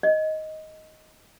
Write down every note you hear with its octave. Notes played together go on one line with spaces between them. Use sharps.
D#5